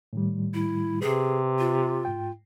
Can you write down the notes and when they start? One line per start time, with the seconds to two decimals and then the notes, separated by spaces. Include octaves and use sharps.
0.13 A2 D#3 G3
0.54 E4
1.02 C3 G#4 B4
1.59 F4
2.05 G#2 G5